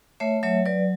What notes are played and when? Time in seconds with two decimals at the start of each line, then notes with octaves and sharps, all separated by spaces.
0.20 A3 C#5 E5
0.43 F#3 C#5 E5
0.66 F#3 B4 D5